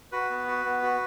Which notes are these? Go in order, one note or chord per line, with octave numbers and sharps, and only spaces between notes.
F#4 B4
B3
F#4
B3
F#4